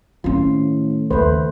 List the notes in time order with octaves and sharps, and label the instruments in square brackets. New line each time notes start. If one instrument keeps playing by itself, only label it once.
[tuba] A2 [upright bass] D#3 C#4 [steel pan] F4
[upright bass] D#2 C#3 [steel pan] A3 B4 C5